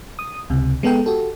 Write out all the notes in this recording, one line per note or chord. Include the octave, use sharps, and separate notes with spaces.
D#6
C#2 C3
G#3 B3 A4 G5
F#4 G4 A4